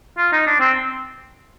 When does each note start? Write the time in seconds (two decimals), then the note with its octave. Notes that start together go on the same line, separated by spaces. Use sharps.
0.18 F4
0.32 D#4
0.47 D4
0.60 C4